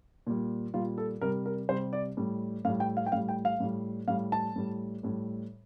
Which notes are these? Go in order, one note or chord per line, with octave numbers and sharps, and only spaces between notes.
A#2 G3
A#2 G3 F4
A4
C3 G3 A#4
A#4
C3 G3 C5
D5
A2 G3
A2 G3 F5
G5
F5
G5
A2 G3 F5
G5
F5
A2 G3
A2 G3 F5
A5
A2 G3
A2 G3